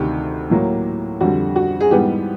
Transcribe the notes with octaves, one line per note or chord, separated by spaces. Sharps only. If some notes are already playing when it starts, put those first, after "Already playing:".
Already playing: D2 C3 D#3 G4
A2 F#3 A#3
F2 D3 G3 F#4
F#4
G#4
G#2 E3 G3 B3 G4